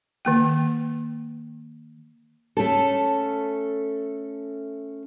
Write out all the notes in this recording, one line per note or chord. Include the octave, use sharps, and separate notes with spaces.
D#3 A#3 G5
A3 C#4 A4